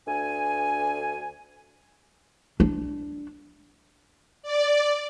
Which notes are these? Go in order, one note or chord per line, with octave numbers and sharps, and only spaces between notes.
D2 G#5
D4
D5